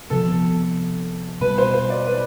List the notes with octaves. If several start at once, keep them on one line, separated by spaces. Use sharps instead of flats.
C3 F3 B3 A4
B2 G3 B3 B4
C5
C5
D5
B4